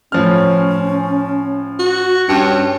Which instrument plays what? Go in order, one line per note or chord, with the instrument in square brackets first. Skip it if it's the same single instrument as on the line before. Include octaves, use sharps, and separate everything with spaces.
[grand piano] A2 F3 F6 [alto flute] C#4
[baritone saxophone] F#4
[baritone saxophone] G2 [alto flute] C#4 [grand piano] C#7